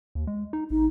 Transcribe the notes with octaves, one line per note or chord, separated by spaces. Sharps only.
D#2
G#3
D#4
A1 D#4